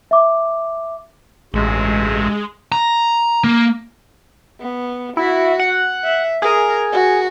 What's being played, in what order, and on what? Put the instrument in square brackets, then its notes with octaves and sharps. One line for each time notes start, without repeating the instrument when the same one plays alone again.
[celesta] E5 D6
[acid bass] A1 [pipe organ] G2 C3 F#4 [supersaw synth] G#3
[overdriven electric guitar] A#5
A#3
[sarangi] B3
[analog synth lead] E4 [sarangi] F#4
[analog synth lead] F#5
[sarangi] E5
[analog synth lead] G#4 [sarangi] A#4
[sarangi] F#4